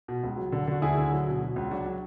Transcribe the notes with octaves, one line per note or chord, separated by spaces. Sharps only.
B2
C#2
F#3
D3
D3 F#4
D2 E4 G#4
D3
F#3
B2
B2
C#2
F#3 D4 F#4
F#3